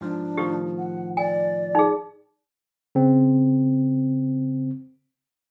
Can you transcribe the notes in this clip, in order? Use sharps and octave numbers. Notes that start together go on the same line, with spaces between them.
G#2 F3 D4
A2 D#3 F3 G4
F#5
D5 G#5
D#4 G#4
C#3 C4